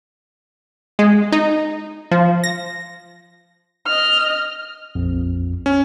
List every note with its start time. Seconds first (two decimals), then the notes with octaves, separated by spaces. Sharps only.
0.99 G#3
1.32 D#4
2.11 F3
2.44 A#6
3.87 D#5 F6
4.95 A#1 F2
5.66 C#4